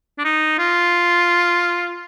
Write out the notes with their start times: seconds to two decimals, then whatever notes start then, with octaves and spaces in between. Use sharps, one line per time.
0.19 D4
0.25 D#4
0.59 F4